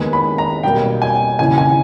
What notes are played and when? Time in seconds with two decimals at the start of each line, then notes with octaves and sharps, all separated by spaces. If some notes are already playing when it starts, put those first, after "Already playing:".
Already playing: D#2 D#3 G#3 B3
0.13 B5
0.38 A#5
0.63 B1 B2 G3 A#3 G5
1.02 G#5
1.39 D#2 C#3 E3 G#5
1.58 G#5